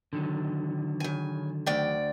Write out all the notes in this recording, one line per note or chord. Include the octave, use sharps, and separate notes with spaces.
D3 D#3 F#3
C#3 G#5
D2 D5 G5